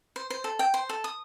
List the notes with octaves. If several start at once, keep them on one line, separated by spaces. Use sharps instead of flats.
C5
C5
A4
G5
C5
A4
D#6